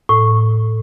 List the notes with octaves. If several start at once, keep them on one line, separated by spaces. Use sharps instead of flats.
A2